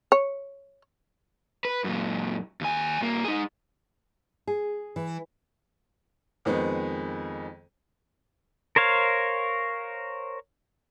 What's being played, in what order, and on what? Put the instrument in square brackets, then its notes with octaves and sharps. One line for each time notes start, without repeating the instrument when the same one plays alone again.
[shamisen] C#5
[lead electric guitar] B4
F#2 A#2
D#2 G#5
G2 A#3
D#4 G#4
[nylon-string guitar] G#4
E3
[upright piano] F2 D#3 G#3 B3 C4
[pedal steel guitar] A#4 C5 C#5 F5